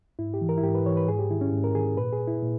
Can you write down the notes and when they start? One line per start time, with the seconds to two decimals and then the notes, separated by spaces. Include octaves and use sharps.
0.19 G#2 E4
0.34 G4
0.41 E3
0.49 A#4
0.57 E4
0.63 G#2 G4
0.75 B4
0.86 E3 C#5
0.97 B4
1.08 G#2 G#4
1.19 G4
1.30 D#3 E4
1.41 C#4
1.53 G#2
1.64 A#4
1.75 D#3 G#4
1.97 A#2 B4
2.13 G#4
2.28 E4
2.43 A#2